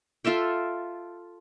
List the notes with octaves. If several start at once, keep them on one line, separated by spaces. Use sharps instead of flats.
F4 A4 E5 G5